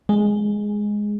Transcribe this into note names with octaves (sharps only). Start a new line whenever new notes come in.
G#3